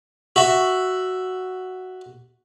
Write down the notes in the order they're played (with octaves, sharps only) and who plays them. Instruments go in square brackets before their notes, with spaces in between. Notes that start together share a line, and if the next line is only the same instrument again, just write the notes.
[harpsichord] F#4 E5